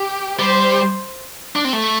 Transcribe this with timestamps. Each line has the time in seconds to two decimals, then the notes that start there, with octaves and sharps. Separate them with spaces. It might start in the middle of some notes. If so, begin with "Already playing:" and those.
Already playing: G4
0.39 G3 C5
1.56 D4
1.65 C4
1.73 A3